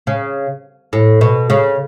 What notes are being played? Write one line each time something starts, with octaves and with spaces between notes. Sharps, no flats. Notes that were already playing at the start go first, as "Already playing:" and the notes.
C#3
A2
B2
C#3